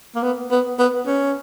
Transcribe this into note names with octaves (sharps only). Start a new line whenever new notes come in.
A#3
B3
B3
B3
C#4